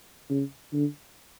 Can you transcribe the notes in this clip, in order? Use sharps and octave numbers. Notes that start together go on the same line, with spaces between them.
C#3
D3